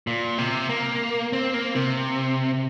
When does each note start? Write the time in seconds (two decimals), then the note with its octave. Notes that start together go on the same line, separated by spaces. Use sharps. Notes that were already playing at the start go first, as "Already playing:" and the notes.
0.07 A#2
0.38 C3
0.69 A#3
1.33 C4
1.54 A#3
1.75 C3